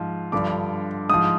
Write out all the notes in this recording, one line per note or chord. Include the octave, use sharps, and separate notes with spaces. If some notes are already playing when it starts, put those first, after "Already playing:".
Already playing: G#2 F3
G2 D3 F3 D6
G#2 F3 D#6